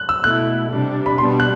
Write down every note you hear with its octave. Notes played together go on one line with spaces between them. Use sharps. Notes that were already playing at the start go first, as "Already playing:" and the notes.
Already playing: F#6
E6
B2 A3 E4 F#6
C3 G3 D4
B5
B2 G3 B3 D4 C6
F#6